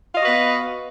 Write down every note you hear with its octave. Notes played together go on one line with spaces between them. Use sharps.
B3 F#4 B4 D#5 F5